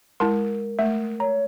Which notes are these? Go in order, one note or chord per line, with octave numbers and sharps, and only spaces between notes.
G#3 E4 A#4 A5 C6
A3 E5
C#5 A#5